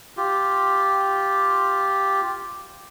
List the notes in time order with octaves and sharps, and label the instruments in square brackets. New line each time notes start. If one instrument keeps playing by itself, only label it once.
[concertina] F4 G4